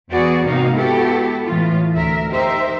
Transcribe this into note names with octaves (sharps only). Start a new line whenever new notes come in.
E2 B3 F#4 G#4 D5
G#2 C3 A#3 D#4 F#4 F5
B3 E4 F#4 G4 A4
A2 E3 F4
D2 A#4 E5
D#4 G4 A#4 C5 E5